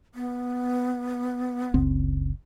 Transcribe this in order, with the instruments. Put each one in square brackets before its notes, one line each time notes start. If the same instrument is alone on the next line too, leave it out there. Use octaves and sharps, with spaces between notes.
[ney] B3
[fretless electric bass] F#1 C#2 C4